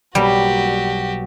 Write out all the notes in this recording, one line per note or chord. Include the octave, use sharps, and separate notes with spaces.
B1 B2 G3 A#3 F#4 G4